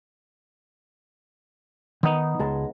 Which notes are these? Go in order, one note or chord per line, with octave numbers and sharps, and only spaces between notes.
D#3 B3 D#4
C#2 G#3 A5